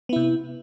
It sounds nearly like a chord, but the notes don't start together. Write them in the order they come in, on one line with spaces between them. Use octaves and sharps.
B3 E4 C3